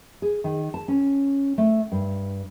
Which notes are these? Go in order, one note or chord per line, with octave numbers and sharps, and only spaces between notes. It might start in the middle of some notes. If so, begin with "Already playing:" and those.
G#4
D#3
A5
C#4
A3
G2